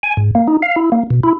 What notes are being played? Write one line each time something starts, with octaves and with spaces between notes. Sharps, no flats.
G#5
G#2
A#3
D#4
F5
E4
A#3
B2
E4